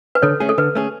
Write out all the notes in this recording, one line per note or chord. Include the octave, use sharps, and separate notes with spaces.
B4
D3 A4 C#5
A3 C#4 G#4
A4
D3 B4
A3 C#4 G#4